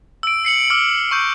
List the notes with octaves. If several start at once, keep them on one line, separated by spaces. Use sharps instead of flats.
E6 D7
C7 C#7 F#7
D6 E6 F6 C#7 F#7
C#6 E6 G6